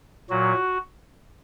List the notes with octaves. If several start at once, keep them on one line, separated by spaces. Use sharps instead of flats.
A#2 F#3 F#4